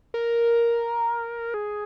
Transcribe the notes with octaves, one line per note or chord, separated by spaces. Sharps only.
A#4
G#4